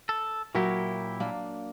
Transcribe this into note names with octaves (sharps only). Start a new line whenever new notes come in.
A4
A#2 F#3 E4 G4 A#4 C#5
A#3 D4